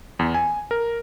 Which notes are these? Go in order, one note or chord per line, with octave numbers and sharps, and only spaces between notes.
E2
G#5
A#4